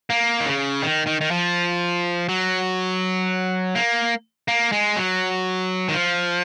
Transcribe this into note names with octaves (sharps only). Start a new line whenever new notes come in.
A#3
D#3
C#3
D#3
D#3
D#3
F3
F#3
A#3
A#3
G#3
F#3
D#3
F3